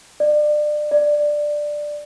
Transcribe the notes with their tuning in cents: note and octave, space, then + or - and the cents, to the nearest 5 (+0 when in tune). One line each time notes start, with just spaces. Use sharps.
D5 +30
D5 +10